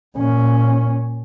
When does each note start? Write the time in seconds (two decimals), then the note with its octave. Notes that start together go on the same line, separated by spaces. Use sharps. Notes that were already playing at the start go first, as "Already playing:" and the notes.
0.16 A#2 C#4